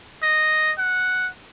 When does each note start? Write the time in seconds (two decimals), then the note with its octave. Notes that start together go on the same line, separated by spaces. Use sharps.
0.23 D#5
0.78 F#5